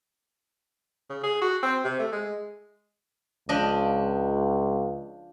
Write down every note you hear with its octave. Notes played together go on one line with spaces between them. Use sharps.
C#3
G#4
F#4
C4
C3
A3
G#3
C#2 F3 D4 D#5